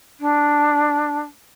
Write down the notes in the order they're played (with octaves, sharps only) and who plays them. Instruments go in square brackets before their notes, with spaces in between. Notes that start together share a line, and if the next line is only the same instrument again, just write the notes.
[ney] D4